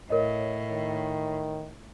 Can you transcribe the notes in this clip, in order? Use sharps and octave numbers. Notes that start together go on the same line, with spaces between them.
A2 A#4 C#5 D#5
D#3